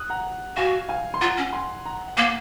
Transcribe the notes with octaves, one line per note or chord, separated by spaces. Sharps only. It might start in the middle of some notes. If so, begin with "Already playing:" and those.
Already playing: D#6 F#6
F#5 A#5
F#4 F5 G#5
F5 G#5
C6
F4 F#5 A#5
C#4
G#5 C6
F#5 A#5
F#5
A#3 F5 G#5